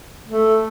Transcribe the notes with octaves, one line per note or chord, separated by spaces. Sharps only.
A3